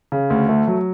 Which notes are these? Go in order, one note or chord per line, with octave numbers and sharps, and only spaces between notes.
C#3
D2
A3
F#3